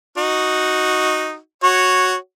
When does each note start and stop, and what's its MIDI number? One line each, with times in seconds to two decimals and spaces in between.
0.17 1.37 63
0.17 1.37 66
1.63 2.15 66
1.63 2.15 73